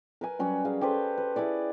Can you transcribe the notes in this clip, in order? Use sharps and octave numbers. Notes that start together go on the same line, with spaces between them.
A#4 B4 G#5
F#3 G3 C#4 F#4
G#4 F5
G4 A4 B4 C5
B4
E4 G#4 C#5 D5